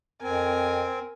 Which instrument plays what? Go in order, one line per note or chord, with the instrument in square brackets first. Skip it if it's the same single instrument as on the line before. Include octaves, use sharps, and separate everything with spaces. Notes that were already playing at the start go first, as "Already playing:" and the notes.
[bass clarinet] F2 [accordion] C4 [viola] A#4 G#5